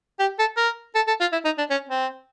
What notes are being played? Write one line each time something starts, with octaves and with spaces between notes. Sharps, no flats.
G4
A4
A#4
A4
A4
F4
E4
D#4
D4
C#4
C4